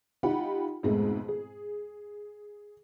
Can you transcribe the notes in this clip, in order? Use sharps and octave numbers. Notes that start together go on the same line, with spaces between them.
D#4 F4 G4 F#5 G5 B5
F2 G#2 B2 G#3 A3 B3
G#4